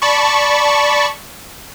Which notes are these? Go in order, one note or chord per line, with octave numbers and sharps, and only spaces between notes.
D5 A5 B5 C#6